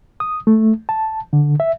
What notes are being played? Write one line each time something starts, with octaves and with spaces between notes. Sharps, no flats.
D#6
A3
A5
D3
E5